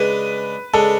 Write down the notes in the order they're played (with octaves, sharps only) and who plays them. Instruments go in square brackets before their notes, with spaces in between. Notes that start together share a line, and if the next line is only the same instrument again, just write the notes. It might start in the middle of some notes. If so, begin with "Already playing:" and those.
Already playing: [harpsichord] C#3 G#3 D4 [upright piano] B4
[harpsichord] C#3 G#3 D4 [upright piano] A4